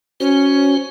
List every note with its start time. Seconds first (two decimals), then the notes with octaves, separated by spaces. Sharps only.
0.20 C#4 F#4 C5